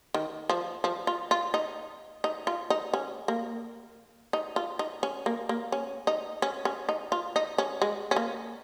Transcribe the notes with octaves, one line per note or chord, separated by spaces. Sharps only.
D#3
F3
F3
F4
F4
D#4
D#4
F4
D#4
C#4
A#3
D#4
F4
D#4
C#4
A#3
A#3
C#4
D#4
C#4
C#4
D#4
F4
D#4
C#4
G#3
C#4
A#3